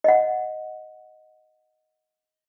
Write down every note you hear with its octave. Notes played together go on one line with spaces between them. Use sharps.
D#5 F#5